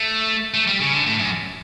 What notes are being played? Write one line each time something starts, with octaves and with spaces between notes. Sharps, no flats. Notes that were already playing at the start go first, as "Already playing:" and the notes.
Already playing: A3
A3
G3
C#3
D3
A2
F#2